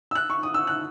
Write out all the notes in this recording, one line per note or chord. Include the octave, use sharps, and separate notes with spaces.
E6
F#6
C#6
D#6
E6
F#6